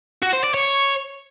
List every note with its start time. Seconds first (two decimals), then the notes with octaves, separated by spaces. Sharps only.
0.23 F#4
0.33 C5
0.44 D5
0.54 C#5